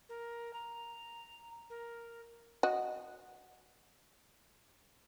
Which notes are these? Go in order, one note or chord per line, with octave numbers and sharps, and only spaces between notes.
A#4
A#5
A#4
F#4 D#5